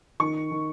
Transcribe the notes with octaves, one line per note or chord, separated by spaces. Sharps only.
D#3 C#6
D#3